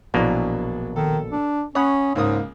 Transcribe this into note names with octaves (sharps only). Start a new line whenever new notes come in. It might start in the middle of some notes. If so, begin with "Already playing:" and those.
A#1 B2 E3 F#3 A#3 D4
D#3 A4
D4
C#4 C#5 F#5 B5 D#6
C#2 G#2 A#3 D#6